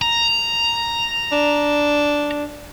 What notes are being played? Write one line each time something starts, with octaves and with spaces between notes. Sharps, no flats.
A#5
D4